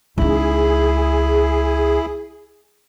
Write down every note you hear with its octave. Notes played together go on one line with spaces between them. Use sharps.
C#2 D#4 E4 G#4